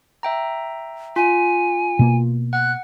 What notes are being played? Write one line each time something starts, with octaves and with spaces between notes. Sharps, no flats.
E5 G5 A#5
F4 G#5
B2 A#3
F#5 F#6